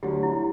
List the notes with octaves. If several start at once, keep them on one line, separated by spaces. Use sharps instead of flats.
D2 D3 F#3 G4
F#4
E4
E4